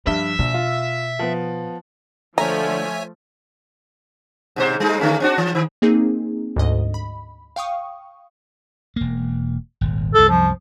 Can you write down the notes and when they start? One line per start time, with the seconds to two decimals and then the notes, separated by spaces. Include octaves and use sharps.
0.07 G2 F3 G3 E5 G7
0.39 A#1 B2
0.54 F4
1.19 F3 B3
2.38 D3 F3 A3 C#5 E5 G#5 A#5
4.56 G#2 B2 C5
4.80 G3 G#3 D#4
5.00 D3 A3 C#4
5.20 C4 D4 F#4
5.38 E3
5.55 D#3
5.82 A#3 C4 D#4 G#4
6.56 D2 G#2 D#5
6.94 B5
7.56 F5 G5 C#6 D#6
8.96 E1 A#3
9.81 D#1 G#1
10.14 C2 F#2 A4
10.29 F3